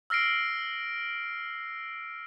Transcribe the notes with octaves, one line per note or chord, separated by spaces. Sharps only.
E6 F6 A#6 C7 D7